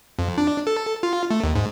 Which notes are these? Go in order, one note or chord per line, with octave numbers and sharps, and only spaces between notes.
F2
D4
A4
F4
A3
D#2
G#2